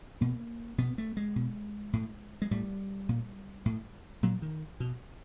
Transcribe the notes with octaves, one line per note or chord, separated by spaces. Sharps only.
B2 A#3
B2 B3
A3
G#3
B2
A2
G#3
A2 G3
A#2
A2
A#2 F#3
D#3
B2